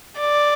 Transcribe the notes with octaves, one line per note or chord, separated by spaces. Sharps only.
D5